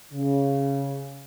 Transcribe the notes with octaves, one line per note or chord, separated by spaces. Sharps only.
C#3